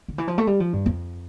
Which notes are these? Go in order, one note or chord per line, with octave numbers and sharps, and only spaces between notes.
D3
E3
F3
A3
G3
F3
G2
F2